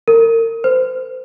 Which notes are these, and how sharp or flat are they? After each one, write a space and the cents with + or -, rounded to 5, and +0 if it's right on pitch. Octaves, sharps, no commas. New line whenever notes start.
A#4 -35
C5 -30